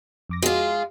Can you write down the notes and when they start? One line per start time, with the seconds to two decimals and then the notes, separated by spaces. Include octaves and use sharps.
0.29 F2 D6 A#6
0.42 G#3 F4 F#4